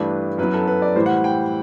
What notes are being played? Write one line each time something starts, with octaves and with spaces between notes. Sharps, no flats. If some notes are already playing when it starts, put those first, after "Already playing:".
Already playing: G2 E3 A3 D4 B4
F#2 F#3 B3 E4 B4
A4
B4
D5
A2 E3 G3 C5
F#5
G5